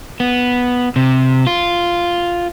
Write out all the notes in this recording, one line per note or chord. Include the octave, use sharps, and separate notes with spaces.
B3
C3
F4